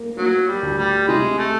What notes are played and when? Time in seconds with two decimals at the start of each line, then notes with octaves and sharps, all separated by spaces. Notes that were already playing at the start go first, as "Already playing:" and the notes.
Already playing: A#3
0.17 F#3 A#3
0.48 G3
0.63 D2
0.78 G3
1.08 C3 G#3
1.38 A3